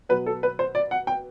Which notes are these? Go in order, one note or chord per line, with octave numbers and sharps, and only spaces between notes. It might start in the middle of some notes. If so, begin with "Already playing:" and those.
B2 F#3 B3 B4
A4
B4
C5
D5
F#5
G5